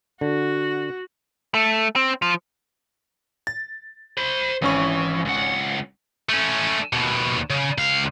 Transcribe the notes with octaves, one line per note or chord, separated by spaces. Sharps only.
D3 F#4
A3
C4
F3
A6
C5 B5
G#1 E3 C#4 C#6
C#2 F#5
A3 C#4
D#2 B2
C#3
C#2 F5